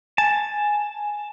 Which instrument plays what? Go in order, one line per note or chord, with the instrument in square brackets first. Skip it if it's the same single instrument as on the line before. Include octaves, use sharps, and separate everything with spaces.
[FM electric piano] G#5 [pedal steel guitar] A5